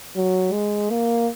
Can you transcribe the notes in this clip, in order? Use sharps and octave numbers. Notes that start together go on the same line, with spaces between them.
F#3
G#3
A#3